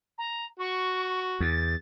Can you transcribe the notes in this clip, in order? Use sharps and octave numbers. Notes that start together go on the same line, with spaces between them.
A#5
F#4 C#6
E2 A6